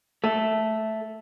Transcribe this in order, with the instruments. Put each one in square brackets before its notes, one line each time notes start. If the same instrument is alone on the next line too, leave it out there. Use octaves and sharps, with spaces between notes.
[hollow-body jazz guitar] A3